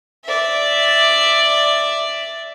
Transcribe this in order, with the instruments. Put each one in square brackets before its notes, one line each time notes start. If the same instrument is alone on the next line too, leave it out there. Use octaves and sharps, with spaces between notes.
[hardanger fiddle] D5 E5